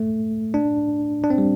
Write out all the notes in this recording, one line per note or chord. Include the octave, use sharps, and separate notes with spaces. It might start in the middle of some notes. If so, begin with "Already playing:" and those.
Already playing: A3
D4
D4
C4
G3